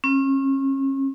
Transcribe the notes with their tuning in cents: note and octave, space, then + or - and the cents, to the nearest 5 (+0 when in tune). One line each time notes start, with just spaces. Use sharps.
C#4 -35